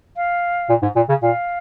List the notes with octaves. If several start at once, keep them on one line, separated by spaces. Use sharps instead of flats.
F5
A#2
G#2
A#2
C#3
A#2 F5